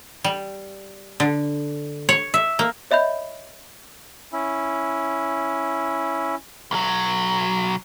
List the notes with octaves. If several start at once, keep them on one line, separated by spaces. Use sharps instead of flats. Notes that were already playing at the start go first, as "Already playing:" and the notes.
G3
D3
C#5
E5
A#3
C#5 D#5 E5 B5 G6
C#4 E4
B1 F#3